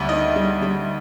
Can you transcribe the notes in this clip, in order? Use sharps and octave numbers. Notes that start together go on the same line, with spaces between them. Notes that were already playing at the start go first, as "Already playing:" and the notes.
Already playing: D2 G3 D5 E5
D#3 D#5
G3
G3